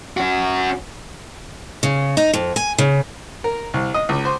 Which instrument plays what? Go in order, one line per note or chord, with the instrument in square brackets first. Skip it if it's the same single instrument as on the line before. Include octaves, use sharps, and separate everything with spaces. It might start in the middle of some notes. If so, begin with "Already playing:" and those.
[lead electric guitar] C#4 F#4
[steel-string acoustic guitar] C#3
D#4
F2
G#5
C#3
[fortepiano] A#4
C2
D#5
C#2
C5